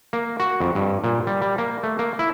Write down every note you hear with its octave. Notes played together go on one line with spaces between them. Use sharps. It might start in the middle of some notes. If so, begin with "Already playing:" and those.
A#3
F#4
F2
G2
A#2
G3
G3
A#3
A3
A#3
E4